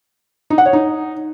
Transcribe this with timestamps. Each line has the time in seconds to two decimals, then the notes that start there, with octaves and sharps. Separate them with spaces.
0.50 D#4
0.58 F#5
0.66 C#5
0.73 D#4